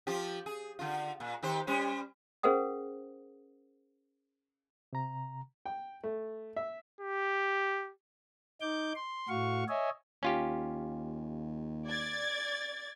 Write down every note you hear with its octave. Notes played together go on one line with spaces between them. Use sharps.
F3 F4 G4
G#4
D3 F4
A#2
D#3 G4 C5
G3 C#4 C5
C#4 G#4 A#4 C5 F#5 D#6
C3 A#5
G5
A3
E5
G4
D#4 D6 G6
C6
A2 F#4 F5 C#6
C#5 D#5 E5 G#5
D#2 C#4 F4 G4
D5 G#6 A6